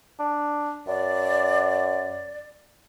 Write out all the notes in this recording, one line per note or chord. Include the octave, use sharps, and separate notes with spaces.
D4
F#2 D5